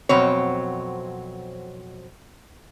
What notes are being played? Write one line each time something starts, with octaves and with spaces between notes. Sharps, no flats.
F2 B2 F#3 C4 C#5